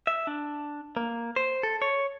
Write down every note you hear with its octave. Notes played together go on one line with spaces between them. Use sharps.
E5
D4
A#3
C5
A4
C#5